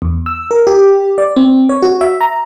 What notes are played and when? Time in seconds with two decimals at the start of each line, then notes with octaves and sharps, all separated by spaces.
0.02 E2
0.26 E6
0.51 A#4
0.67 G4
1.18 D5
1.36 C4
1.69 C#5
1.82 F#4
2.01 E5
2.21 A#5